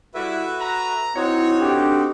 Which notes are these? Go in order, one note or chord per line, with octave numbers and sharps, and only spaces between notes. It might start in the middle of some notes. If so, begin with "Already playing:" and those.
G3 E4 F#4 A4 B4 E5
A#5
C4 D#4 E4 F#4 C#5
D4 G4 A4